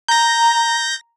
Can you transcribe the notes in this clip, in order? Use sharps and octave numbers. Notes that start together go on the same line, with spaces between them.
A#5 G6 A#6